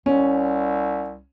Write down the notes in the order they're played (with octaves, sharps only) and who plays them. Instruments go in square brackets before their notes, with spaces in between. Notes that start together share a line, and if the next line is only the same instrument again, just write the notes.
[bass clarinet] C2 [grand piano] C#4